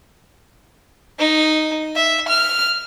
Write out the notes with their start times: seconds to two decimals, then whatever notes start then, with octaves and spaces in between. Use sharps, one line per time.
1.19 D#4
1.96 E5
2.28 F6